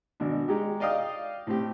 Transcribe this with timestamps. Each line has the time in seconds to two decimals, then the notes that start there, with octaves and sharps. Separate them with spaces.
0.20 G#1 B2 D4
0.48 G#3 D#4 G4
0.80 D5 D#5 F5 G5 D#6
1.47 A2 C4 G4